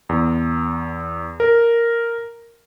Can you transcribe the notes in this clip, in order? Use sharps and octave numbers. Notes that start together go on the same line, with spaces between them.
E2
A#4